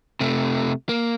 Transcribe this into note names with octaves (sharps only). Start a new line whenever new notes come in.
C3 A3
A#3